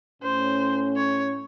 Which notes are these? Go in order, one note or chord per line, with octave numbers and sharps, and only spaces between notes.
A2 A3 C#4 C5
C#5